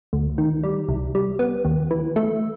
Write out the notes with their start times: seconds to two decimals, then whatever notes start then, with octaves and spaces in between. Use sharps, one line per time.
0.13 D2
0.38 D#3
0.63 G3
0.89 C2
1.15 G3
1.39 B3
1.65 D#2
1.91 E3
2.16 A3